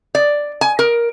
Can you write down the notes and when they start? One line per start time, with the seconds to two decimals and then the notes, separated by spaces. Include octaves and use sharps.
0.15 D5
0.61 G#5
0.79 A#4